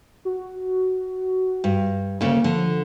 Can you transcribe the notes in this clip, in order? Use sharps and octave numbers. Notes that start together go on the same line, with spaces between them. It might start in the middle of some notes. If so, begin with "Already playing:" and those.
F#4
G2
D2 C#3 A#3
D3 F3